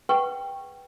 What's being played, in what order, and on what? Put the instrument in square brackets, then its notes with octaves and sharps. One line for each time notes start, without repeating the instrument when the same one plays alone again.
[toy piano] G#4 B4 F#5 G5 C#6